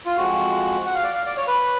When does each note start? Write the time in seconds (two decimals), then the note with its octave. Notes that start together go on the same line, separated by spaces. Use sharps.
0.06 F4
0.16 F2 F3 G#3 F#4
0.86 F#5
0.95 F5
1.03 D5
1.14 F5
1.26 D5
1.37 C#5
1.47 B4